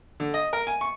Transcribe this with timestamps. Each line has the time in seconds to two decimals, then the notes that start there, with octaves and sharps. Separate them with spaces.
0.20 D3
0.34 D#5
0.53 A#4
0.67 G#5
0.81 C#6